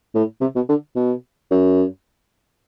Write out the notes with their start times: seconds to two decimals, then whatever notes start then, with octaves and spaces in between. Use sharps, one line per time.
0.15 A2
0.41 C3
0.55 B2
0.69 D3
0.96 B2
1.51 F#2